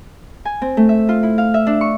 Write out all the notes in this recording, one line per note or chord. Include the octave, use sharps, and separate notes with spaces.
G#5
C4
A3
E5
F4
E4
F5
E5
D4
C#6